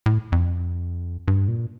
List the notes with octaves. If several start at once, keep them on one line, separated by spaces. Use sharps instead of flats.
A2
F2
G2
A#2